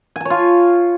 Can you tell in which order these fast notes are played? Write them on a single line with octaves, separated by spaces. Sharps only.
G#5 A5 C#5 F4